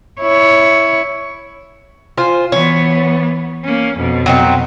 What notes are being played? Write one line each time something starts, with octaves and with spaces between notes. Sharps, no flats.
E4 C#5
F4 C5 G#5
E3 B3 C#5
A#3 C#4
F2 B2
F#3 C4 D#4